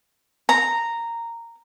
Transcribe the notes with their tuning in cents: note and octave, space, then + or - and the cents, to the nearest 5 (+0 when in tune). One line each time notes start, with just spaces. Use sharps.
A#5 -10